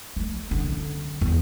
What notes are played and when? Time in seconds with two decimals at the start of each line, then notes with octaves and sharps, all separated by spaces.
0.16 A3
0.51 F#2 D3
1.21 E2